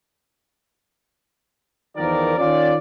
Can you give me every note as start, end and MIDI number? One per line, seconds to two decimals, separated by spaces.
1.96 2.34 40
1.96 2.34 51
1.96 2.34 53
1.96 2.34 70
1.96 2.34 74
2.38 2.76 51
2.38 2.76 61
2.38 2.76 65
2.38 2.76 74